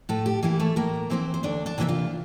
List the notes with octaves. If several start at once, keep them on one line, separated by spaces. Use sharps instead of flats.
A2 A3 A4
G4
E3 A#3 E4 G4
A3 A4
A2 A#3 A#4
E3 A#3 C4 E4 C5
C5
D2 D4 D5
D4 D5
C3 E3 A#3 E4 E5
F4 F5